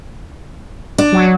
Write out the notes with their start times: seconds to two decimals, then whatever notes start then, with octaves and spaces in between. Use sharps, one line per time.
0.98 D4
1.12 F#3